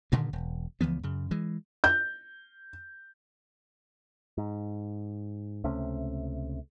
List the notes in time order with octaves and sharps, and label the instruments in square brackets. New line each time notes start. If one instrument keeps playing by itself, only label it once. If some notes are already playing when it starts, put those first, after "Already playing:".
[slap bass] G2 A#2 D3 D#3
E1
C#2 E3 F3 B3
F#2 C#3
E3 G#3
[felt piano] G6
[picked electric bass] G#2
C#2 C3 A3 C#4